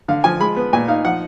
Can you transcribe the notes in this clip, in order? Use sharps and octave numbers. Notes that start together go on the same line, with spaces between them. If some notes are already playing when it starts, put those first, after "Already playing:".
D3 F5
F3 G#5
G#3 B5
B3
A#2 G#5
D#4 F5
F3 F#5